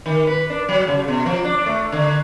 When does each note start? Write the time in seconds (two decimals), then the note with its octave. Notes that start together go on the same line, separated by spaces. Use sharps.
0.06 D#3
0.27 B4
0.50 D4
0.69 F#3
0.87 C#3
1.08 B2
1.26 F3
1.45 D4
1.66 A3
1.92 D3